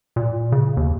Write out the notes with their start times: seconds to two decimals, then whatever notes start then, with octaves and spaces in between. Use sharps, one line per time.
0.16 A#2
0.52 C#3
0.77 D#2